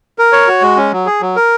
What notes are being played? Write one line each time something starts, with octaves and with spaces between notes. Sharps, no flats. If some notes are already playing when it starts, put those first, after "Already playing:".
A#4
C#5
F#4
G#3
C#4
F#3
G#4
F#3
A#4